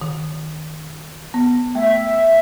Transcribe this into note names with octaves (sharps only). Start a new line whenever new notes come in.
D#3
B3
A3 E5